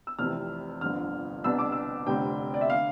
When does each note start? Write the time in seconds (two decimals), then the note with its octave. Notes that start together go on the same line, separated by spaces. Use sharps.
0.07 E6
0.19 F1 F2 C3 E3 F6
0.81 G1 F2 D3 F6
1.44 C2 B2 B3 D4 E6
1.59 D6
1.72 E6
2.06 F1 F2 D3 G3 C4 G5
2.54 D5
2.61 E5
2.70 D3 F5